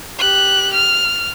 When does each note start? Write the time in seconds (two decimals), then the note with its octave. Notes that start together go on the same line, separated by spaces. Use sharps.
0.19 G4 F#6
0.73 F6